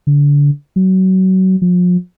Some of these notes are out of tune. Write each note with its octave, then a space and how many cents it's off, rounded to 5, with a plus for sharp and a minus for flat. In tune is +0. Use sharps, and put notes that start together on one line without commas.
D3 -30
F#3 +25
F3 +40